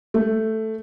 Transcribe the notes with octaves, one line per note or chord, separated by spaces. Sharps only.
A3